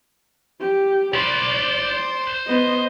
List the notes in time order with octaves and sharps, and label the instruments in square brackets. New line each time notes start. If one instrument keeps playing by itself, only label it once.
[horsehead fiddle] G4
[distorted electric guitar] C5 B5 [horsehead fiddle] D5
[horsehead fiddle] B3 D#5